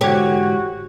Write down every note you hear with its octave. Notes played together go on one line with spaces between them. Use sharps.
G#2 D3 E3 F#4 G4 C#5